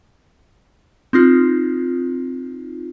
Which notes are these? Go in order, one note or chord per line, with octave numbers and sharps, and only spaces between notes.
C4 D#4 F4